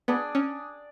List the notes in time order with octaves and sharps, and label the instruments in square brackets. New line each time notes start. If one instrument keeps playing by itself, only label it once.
[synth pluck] B3 [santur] D4 G#4 D5
[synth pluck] C#4